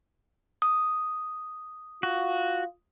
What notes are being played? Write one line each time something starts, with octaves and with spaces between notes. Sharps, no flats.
D#6
F4 F#4